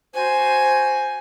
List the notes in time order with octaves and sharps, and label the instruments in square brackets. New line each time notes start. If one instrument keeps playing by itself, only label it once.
[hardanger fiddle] F#4 G#5 [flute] C5